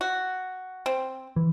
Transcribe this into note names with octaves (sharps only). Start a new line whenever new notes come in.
F#4
C4
E3